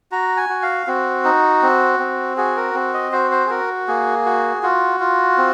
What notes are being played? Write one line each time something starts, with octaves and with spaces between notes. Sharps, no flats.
F#4 A#5
G#5
F#4
F5
C4 F#4
D#4
C4
C4
F#4 G#4
A#4
C4
D#5
F#4 C5
C5
G#4
F#4 A#4
A#3 G#4
F#4
F4 F#4
F4
C4